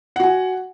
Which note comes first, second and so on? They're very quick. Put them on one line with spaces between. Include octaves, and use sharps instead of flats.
F#5 F#4 G#5